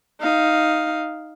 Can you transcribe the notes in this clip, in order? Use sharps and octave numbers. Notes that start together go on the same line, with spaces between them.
D#4 F5